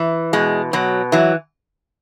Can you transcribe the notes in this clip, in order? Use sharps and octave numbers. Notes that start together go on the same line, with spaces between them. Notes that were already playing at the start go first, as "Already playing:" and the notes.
Already playing: E3
B2 G#3
B2 F#3
E3 F#3